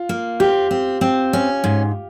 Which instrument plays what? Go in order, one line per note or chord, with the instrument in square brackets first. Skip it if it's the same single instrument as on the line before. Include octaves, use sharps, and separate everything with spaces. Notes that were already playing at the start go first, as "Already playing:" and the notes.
Already playing: [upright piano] F4
[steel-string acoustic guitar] A#3
[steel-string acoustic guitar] C4 [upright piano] G4
[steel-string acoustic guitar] C4
C4
C#4
G#2